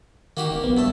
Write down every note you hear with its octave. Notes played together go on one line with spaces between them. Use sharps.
D#3 A#3 F#4 G4
E1
A#1 B3
G2 A3 A5